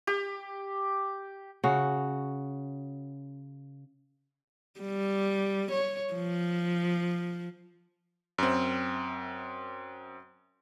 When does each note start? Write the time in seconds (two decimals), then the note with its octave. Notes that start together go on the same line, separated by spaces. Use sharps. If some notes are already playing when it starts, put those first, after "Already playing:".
0.07 G4
1.64 C#3 C#4 F#4
4.80 G3
5.71 C#5
6.14 F3
8.38 F#2 C4